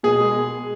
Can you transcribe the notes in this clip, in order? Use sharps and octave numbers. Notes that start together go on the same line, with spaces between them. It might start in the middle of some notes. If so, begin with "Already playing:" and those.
B2 G#4
G#3